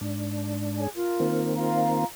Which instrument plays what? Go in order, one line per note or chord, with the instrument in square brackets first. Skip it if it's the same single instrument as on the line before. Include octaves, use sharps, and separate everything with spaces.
[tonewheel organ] G#2 D4
[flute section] G#4 C#5 G#5
F4 A#4
[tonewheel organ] D#3 A#3 C4
[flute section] F4 F5 A#5